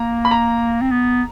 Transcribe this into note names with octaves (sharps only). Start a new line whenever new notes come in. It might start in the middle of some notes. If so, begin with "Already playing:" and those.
Already playing: A#3 A#5
B5
A#5
C4
B3